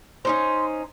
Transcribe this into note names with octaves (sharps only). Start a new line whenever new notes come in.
C#4 D#4 C5 C6